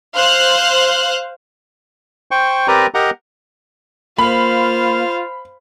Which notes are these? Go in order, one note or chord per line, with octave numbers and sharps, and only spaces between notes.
C5 F5 F#6
C5 G5 C#6
C4 G4 A#4 B4 D5 A#5
G4 A#4 D#5 F#5 A#5
A#3 F4 C5 F5 B5